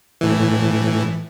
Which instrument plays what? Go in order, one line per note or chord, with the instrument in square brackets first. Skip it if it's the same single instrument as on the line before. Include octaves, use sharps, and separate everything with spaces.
[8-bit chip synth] A2 E3